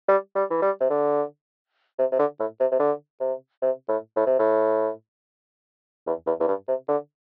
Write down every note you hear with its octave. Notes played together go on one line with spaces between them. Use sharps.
G3
G3
E3
G3
C3
D3
C3
C3
D3
A2
C3
C3
D3
C3
C3
A2
A2
C3
A2
E2
E2
E2
G2
C3
D3